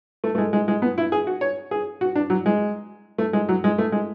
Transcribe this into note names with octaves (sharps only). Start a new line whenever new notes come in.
A3
A3
G#3
G#3
G#3
B3
E4
G#4
F#4
C#5
G#4
F#4
D4
F#3
G#3
A3
G#3
F#3
G#3
A3
G#3